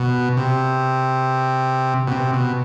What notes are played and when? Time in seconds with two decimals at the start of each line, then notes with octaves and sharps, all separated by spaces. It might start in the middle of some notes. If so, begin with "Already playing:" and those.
Already playing: B2
0.37 C3
2.08 B2
2.11 C3
2.33 B2